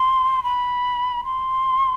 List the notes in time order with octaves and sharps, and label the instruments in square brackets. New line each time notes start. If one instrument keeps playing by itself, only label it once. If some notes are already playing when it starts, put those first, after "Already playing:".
Already playing: [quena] C6
B5
C6